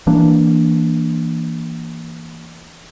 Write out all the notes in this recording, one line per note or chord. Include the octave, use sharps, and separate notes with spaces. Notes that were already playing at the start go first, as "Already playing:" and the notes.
E3 A#3 D4